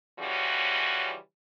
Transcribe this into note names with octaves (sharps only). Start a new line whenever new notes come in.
C#3 E3 F3 G3 C#4 F#4